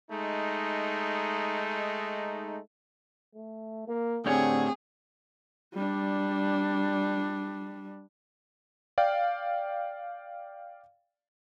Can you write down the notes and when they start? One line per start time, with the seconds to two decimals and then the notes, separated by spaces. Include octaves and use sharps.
0.10 G#3 A3 D#4
3.35 A3
3.88 A#3
4.26 A2 D3 C4 G4 G#4 C#5
5.74 G3 D4
8.98 D5 F5 G5